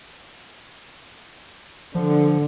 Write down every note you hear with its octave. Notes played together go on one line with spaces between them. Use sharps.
D3 F3